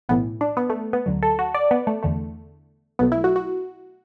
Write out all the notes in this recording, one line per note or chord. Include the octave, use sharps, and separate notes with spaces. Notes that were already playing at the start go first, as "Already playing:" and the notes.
B1 A2 E3 B3
D4
B3
A3
B3
D2 D3 F#3
A4
F#4
D5
B3
A3
E2 D3 A3
B1 B2 F#3 A3 B3
E4
F#4
F#4